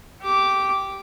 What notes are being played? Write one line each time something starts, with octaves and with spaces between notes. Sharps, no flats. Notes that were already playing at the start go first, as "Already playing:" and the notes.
G4 D6